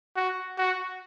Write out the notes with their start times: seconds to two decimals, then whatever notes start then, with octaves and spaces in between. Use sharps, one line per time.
0.16 F#4
0.58 F#4